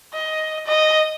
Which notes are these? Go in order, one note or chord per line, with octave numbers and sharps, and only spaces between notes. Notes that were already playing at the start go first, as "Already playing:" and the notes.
D#5
D#5